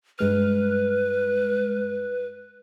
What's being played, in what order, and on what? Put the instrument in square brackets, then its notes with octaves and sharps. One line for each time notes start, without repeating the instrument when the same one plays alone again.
[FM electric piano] G2 G#3 F6 [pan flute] B4